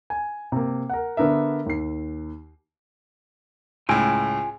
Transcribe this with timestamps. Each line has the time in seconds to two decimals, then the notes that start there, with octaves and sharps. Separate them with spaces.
0.10 G#5
0.52 C3 A#3
0.90 A#4 F#5
1.17 D3 B3 D4 A#4 E5
1.66 D#2 C7
3.89 C#2 A2 F4 G5 G#5